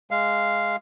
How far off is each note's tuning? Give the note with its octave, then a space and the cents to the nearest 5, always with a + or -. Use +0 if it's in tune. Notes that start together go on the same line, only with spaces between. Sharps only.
G#3 +0 F5 -10